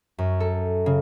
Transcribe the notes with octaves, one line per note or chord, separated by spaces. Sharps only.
F#2
A4
C#3